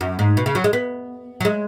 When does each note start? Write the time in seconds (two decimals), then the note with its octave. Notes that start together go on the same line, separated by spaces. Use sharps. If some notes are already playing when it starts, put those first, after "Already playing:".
0.01 F#2
0.19 G#2
0.37 B2
0.46 C#3
0.55 F#3
0.64 G#3
0.73 B3
1.41 F#3
1.45 G#3